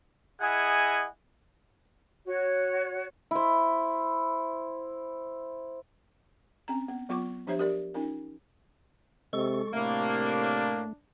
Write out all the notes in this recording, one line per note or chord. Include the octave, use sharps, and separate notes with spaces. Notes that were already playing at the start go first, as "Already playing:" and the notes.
E4 G#4 D#5 F#5 G#5
F#4 C#5
E4 C5
C4 C#4 A#5
B3
F#3 B3 F4 C#6 D6
F3 D4 G4 C5 C#5 E5
G4 A#4 D5
C#4 D#4 F4 A#4
C3 G#3 A4 C#6
A2 C3 A3 A#3 D4